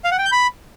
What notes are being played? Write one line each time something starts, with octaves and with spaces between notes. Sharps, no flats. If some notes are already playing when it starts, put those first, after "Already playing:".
F5
F#5
G5
G6
B5